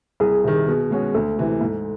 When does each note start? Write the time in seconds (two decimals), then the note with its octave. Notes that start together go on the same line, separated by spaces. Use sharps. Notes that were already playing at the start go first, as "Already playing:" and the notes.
0.20 C2 G#4
0.44 C3 D#3
0.68 B2
0.91 G#3 C#4 F#4
1.14 D2 A4
1.38 C3 E3
1.61 G#2